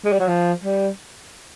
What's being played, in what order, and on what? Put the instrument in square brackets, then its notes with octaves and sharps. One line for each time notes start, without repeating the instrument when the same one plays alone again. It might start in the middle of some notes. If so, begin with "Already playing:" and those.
[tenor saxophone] G#3
G3
F#3
F3
G3